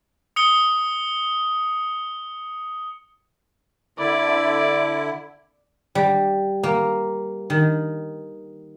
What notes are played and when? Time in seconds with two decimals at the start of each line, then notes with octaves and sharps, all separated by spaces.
0.36 D#6 C#7 G7
3.99 D3 E4 D5
5.95 G3
6.63 A#3
7.50 D#3